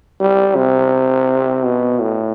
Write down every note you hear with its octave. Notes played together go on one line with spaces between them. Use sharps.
G3
C3
B2
A2